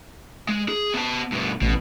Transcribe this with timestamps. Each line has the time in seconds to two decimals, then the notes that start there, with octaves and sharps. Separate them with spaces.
0.49 G#3
0.69 G#4
0.94 B3 A5
1.32 G2 B2
1.62 A1 B2